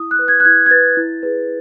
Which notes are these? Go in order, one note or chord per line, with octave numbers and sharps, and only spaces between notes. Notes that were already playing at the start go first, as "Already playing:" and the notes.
Already playing: E4 D#6
F#6
B4
G#6
F#6
E4 G#6
G#6
B4 A6
E4
G#4 B4